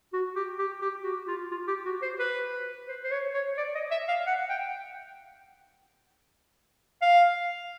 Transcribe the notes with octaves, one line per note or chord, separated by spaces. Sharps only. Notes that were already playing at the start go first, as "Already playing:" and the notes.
F#4
G4
G4
G4
F#4
F4
F4
G4
F#4
C5
B4
C5
C5
C#5
C#5
D5
D#5
E5
F5
F#5
G5
F5